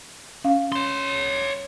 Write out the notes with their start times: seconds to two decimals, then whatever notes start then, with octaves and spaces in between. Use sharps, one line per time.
0.44 C#4 F5
0.72 C#5 C6